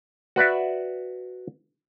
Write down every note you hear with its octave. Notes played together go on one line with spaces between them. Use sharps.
F#4 B4 D5 E5